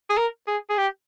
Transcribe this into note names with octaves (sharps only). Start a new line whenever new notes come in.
G#4
A#4
G#4
G#4
G4